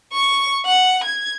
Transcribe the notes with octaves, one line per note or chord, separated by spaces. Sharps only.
C#6
F#5
G#6